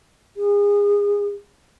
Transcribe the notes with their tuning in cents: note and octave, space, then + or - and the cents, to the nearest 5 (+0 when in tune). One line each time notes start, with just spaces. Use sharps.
G#4 -30